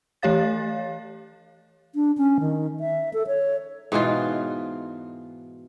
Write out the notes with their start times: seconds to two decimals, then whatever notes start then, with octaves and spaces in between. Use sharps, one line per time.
0.23 E3 A3 G4 C#5 F5 A6
1.95 D4
2.18 C#4
2.40 D#3
2.80 E5
3.14 A4
3.27 C#5
3.92 G#2 B2 E3 F4